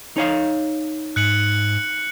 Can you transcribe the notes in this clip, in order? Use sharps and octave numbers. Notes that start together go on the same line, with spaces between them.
D#4 C#5 F5
G#2 F#6 C#7 F#7